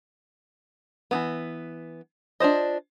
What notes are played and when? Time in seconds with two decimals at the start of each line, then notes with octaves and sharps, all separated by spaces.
1.11 E3 F#3 B3
2.40 D4 F4 C5 D#5